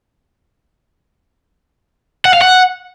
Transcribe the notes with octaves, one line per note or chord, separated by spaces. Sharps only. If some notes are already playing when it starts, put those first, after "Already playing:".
F#5
F5
F#5